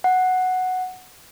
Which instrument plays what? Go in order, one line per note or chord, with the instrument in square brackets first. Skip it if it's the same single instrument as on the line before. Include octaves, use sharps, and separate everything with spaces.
[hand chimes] F#5